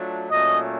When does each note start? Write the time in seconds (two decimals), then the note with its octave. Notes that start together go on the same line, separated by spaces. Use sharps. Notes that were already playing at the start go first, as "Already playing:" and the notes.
Already playing: F#3 A3 D4 F4
0.30 A#2 F#3 A3 C#4 D#5